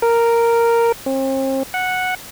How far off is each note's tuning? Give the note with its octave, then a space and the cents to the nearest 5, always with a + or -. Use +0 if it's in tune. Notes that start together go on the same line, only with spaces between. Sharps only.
A#4 -5
C4 +40
F#5 -5